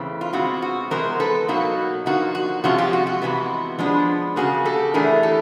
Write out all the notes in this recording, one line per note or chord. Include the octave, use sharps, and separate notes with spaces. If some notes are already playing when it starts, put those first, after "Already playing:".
Already playing: C#3 E3 A3 C4
F4
B2 G#3 C4 F4 F#4
F#4
C3 E3 G#3 B3 A#4 C5
A4 B4
B2 F#3 A#3 D#4 F#4
D3 F3 A#3 D#4 F#4
F#4
C3 F3 G#3 C#4 F4 F#4
F4 G4
F#4
F#4
C3 E3 G#3 B3
F3 G#3 B3 D4
C#3 F3 A#3 F#4 G#4
G4 A4
A2 E3 A3 D4 G#4 A#4
G4 A4